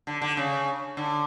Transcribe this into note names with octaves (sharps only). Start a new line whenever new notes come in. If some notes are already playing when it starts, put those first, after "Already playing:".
D3
D3
C#3
D3